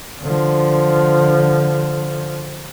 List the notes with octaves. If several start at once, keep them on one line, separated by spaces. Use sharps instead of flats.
D3 F3